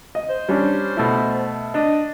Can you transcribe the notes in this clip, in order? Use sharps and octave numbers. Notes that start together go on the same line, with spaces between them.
D#5
C5
G3 C#4 D4
B2 A3 E4
D4 D#5